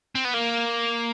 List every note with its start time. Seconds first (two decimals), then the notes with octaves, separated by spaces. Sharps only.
0.15 C4
0.25 B3
0.34 A#3